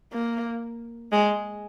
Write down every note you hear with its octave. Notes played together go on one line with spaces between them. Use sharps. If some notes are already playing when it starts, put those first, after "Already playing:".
A#3
G#3